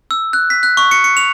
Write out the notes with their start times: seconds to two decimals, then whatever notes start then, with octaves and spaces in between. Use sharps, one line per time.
0.11 E6
0.33 F#6
0.50 B6
0.63 F#6
0.77 C#6
0.91 C#7
1.04 C#7
1.17 F7